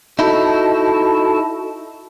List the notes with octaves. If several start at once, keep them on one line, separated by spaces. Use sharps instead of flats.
D#4 E4 F#4 A4 A5